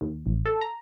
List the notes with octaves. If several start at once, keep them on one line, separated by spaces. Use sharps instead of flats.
D#2
A1
A4
A#5